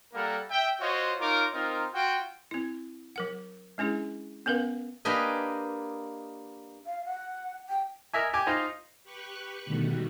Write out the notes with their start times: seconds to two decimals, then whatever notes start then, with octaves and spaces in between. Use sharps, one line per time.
0.14 G3 A#3 A4 A#4 F#5
0.50 E5 G5
0.80 F4 F#4 C5 C#5 D#5
1.19 D#4 F4 A#4 C#5 D6
1.53 C4 D#4 F4 A#4
1.93 F4 F#4 G5
2.51 C4 E4
3.16 F#3 A#4 F#5
3.78 G#3 C#4 D4 E4 G#4
4.46 B3 C#4 A#4 B4 F5
5.05 A#3 D4 G4 B4 D#5 G#5
6.86 F5
7.06 F#5
7.69 G5
8.14 A#4 D#5 E5 G#5
8.34 G4 G#5 D6
8.47 D#4 F4 C5 D#5
9.04 G4 B4 C#6 F#6
9.65 B2 D3 D#3 G3 A3 F#4